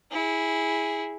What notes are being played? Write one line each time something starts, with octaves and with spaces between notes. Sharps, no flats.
E4 G#4